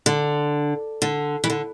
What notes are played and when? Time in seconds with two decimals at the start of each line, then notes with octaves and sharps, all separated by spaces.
0.06 D3
1.02 D3
1.44 E3
1.50 D3